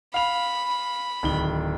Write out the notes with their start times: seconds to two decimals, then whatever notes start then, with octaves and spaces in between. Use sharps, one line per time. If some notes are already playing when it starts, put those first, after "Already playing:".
0.14 F5 B5 F7
1.23 D1 D#3 G7